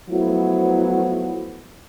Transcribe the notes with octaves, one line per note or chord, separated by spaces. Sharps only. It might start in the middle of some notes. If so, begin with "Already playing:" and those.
F3 F#3 A3 B3 E4